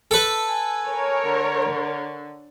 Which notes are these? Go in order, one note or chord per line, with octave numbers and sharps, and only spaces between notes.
A4 B4
G#5
A#4 C#5
D3